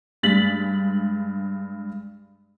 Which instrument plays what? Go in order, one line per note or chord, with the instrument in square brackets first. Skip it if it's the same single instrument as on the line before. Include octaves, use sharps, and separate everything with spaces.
[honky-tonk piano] G2 G#3 A6 B6 F#7